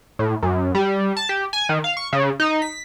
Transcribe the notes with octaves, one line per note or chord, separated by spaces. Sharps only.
A2
F#2
G3
A5
G4
G#5
D#3
F5
C#6
C#3
D#4
B6